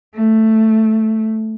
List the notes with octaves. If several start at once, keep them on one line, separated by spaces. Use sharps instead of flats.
A3